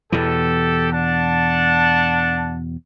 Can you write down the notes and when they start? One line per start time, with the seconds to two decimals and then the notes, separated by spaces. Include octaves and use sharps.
0.12 E2 B2 E3 G4 A4
0.92 D4 F#5 A5